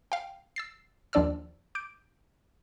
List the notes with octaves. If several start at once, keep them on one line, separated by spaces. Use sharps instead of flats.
F5 G5
E6 A6 C7
D#2 F3 D4 D5 E6 F6
D6 G6 D7